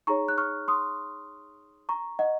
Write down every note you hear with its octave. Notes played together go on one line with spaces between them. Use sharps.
D#4 G#4 C#5 A#5 C#6
F#6
C#6 F6
C6 D#6
A#5 C#6
D#5 F#5